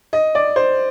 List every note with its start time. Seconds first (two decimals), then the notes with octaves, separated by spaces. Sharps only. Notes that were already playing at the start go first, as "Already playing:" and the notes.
0.13 D#5
0.35 D5
0.56 C5